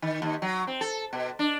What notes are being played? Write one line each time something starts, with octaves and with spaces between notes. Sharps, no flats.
D#3
D#2
F#3
C4
A4
B2
D4